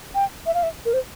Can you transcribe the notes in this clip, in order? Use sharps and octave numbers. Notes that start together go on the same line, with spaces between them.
G5
E5
F5
E5
A#4
C5